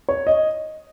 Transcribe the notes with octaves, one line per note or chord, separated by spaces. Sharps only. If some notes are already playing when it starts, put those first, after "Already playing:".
C#5
D#5